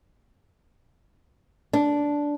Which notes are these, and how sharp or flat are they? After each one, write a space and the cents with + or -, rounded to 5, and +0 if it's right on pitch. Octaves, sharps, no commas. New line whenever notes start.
D4 -10